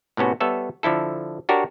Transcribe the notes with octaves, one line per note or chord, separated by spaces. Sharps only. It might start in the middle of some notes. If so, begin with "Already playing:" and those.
A2 C3 B3 C#4 F#4
G3 B3 A4 C#5 E5
D3 F3 E4 A4
D4 F#4 G4 A#4 C#5